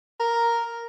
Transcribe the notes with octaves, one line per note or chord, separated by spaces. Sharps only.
A#4